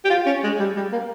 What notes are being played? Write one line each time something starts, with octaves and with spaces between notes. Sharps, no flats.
G4
F4
C#4
G#3
G3
G3
A#3